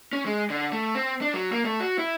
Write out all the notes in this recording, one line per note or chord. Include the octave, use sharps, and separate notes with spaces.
C#4
G#3
D3
A3
C4
D4
F#3
A#3
A3
F#4
E4